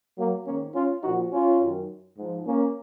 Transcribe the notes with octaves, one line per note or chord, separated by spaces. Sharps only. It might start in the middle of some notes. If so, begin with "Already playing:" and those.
F#3 A#3
G#2 D#3 A#3 C#4
C#4 F4
A#2 F3 D#4 F#4
C#4 F4
F#2 D#3
G#2 F3
A#3 C#4